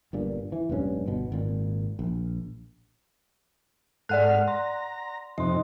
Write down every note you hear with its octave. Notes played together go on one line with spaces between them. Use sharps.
G1 G2 A#2
E3
F1 A#1 G2 C#4
G1 B2
G#1 A#2
A#1
G#2 A4 D5 F#5 F6 F#6
A#5 C6
F2 C3 D#4 D#5 C6